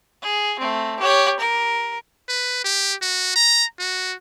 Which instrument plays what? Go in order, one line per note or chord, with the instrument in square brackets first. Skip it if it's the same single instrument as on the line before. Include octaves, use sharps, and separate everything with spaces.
[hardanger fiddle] G#4
A3 C4
G4 C#5
A#4
[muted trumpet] B4
G4
F#4
A#5
F#4